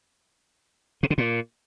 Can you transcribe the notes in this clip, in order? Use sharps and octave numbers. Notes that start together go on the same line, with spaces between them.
C3
D3
A#2